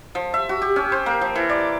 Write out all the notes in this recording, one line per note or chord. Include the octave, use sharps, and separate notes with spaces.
F3
E5
F#4
G4
C#4
C5
A#3
F3
E3
D5